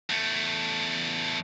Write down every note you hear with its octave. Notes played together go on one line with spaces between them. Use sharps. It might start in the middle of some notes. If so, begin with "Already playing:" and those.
E2 A3